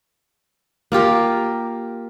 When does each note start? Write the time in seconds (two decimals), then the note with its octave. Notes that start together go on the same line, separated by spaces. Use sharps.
0.92 A#3 F4 G4 A#4